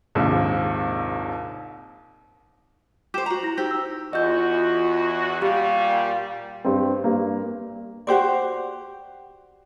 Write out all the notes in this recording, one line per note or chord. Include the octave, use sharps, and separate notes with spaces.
A#1 D#2 G#2 C3
G4 C5 D6 E7
F#4 A#5
E4 A#6
D#4 G4 C5 E6
E6
E2 F4 F#4 D#5 G6
A#2 G3 G4 F5 C#6
G2 C4
G2 A#3
F#4 G4 C5 D5